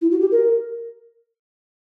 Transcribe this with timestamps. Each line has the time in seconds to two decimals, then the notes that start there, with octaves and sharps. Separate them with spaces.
0.02 E4
0.11 F#4
0.21 G4
0.31 A#4